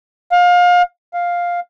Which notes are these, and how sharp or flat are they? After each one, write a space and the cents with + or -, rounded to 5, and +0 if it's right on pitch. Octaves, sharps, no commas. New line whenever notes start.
F5 +30
F5 +5